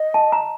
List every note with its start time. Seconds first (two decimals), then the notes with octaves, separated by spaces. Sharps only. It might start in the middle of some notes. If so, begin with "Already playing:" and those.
Already playing: D#5
0.14 A5
0.32 A#5